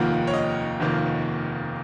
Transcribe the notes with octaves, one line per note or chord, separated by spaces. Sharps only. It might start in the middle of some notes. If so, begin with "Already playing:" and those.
Already playing: F1 D#2 D#3 A#3 F4 F#5
C#5
D#5
F1 D#2 D#3 A#3 F4